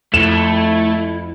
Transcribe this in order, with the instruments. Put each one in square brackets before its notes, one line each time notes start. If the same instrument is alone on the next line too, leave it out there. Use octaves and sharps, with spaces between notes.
[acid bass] F2 [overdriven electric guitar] A3 [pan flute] E4 [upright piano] E7